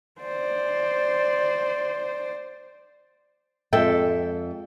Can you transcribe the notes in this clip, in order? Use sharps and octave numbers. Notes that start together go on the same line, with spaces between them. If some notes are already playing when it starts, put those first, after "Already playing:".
C5 D5
F2 G#3 A4 E5 G5